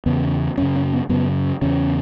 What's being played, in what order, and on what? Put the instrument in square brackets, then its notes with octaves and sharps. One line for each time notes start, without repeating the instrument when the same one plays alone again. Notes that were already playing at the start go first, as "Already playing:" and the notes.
[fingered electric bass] E2 C#3 B3
F#2 C#3 C#4
C#4
B3
F#2 C#3 B3
E2 C#3 C#4